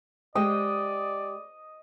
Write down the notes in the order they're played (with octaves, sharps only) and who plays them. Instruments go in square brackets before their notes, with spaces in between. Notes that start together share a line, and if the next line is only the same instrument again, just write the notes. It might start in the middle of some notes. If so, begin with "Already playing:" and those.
[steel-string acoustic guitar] G#3 G4 G5 [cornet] D5 [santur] D#5